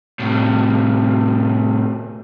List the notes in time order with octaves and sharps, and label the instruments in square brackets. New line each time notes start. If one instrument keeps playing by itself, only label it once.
[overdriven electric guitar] A2 C3